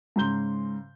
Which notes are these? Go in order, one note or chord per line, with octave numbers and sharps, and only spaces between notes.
G#2 C#3 A#5 C6 G6 G7